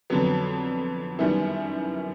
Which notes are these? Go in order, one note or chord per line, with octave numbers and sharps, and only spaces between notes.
F2 D3 F#3 B3
F#2 D#3 G3 B3 E4